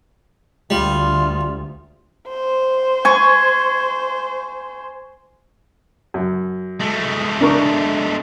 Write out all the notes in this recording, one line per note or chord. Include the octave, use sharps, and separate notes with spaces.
D2 G3 F4
C5
G#5 C#6
F#2
G#3 A3
D4 A#4 C#6